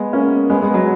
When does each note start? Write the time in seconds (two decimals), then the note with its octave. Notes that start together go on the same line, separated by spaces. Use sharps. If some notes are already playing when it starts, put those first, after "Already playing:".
Already playing: G#3 B3
0.13 A#3 C#4
0.50 G#3 B3
0.62 G#3 B3
0.74 F#3